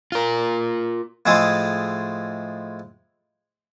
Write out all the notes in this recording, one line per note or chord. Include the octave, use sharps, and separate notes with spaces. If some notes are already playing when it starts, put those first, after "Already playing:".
F4 A#4
A2 F3 G#3 A3 G#4